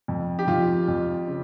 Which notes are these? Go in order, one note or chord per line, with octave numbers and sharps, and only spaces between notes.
F2
G4
F2 F4
F2
C#3